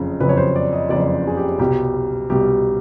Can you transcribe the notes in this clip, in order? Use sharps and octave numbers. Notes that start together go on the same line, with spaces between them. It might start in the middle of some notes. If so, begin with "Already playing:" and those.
Already playing: F#1 F2 C#3
F#1 F2 C#3 B4
C#5
C5
D5
D#5
F#1 F2 C#3 D5
G#4
G4
C2 B2 G3 G4
C2 B2 G3 G4